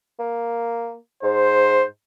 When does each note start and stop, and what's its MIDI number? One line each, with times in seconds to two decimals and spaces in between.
0.19 0.95 58
1.23 1.84 44
1.23 1.84 72